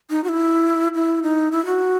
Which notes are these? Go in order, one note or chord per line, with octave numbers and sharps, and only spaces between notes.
D#4
F#4
E4
E4
D#4
E4
F#4